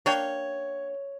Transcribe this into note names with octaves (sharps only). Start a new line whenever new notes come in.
A#3 D4 C#5 G5